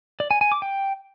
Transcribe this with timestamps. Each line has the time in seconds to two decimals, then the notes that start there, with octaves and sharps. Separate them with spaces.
0.20 D5
0.31 G#5
0.41 G#5
0.52 D6
0.62 G5